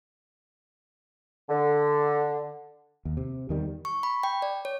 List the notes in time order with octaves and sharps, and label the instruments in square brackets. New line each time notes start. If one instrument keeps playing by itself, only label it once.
[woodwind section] D3
[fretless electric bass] D#2
C3
E2 D#3 G3
[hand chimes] C#6
B5
G5
D5
C#5